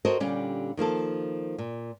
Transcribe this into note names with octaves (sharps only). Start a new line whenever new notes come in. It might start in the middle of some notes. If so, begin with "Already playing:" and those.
F#4 A4 A#4 C5 C#5 D#5
A#2 D3 G3 C#4 G4
D#3 F3 A#3 A4
A#2